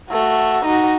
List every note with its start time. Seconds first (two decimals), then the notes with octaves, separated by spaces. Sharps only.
0.11 A3 F#4
0.65 D#4 F#4